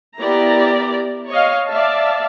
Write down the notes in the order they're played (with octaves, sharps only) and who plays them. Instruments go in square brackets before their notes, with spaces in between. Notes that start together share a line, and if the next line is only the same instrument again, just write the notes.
[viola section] B3 E4 G4 A#4 D5 A#5
C#5 D#5 F5
D5 E5 F5 A5